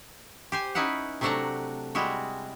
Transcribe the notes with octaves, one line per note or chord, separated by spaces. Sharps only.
G4 C5 G#5
C#4 D#4 E4 B4 F#5
C3 F#3 A3 D4 F#5 A#5
G3 G#3 E4 F#4